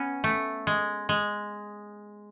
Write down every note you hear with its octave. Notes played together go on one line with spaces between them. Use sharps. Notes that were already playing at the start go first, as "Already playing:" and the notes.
Already playing: B3 C#4
A3
G#3
G#3